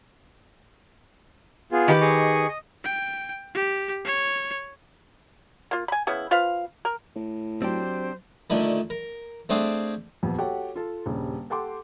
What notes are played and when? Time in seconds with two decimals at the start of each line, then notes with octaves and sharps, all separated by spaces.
1.72 B3 F4 G#4
1.88 D#3 G4 B4
2.01 G#4 D#5 C#6
2.48 D#5
2.84 G5
3.54 G4
4.05 C#5
5.71 A#3 F4
5.88 G#5 B5
6.07 C#3 B3 E4
6.31 F4 B4 C5 F5
6.85 A#4
7.16 A2
7.62 F#3 C4 D4 G4 C5
8.50 A#2 D3 D#3 A3
8.90 A#4
9.49 A3 C4 D4 G#4 C5 F5
10.23 D#1 F2 B3
10.38 F#4 G4 A4 C#5 F#5
10.76 F4 A4
11.06 D#1 G2 C#3
11.50 G4 A4 F#5 G5 C6 D6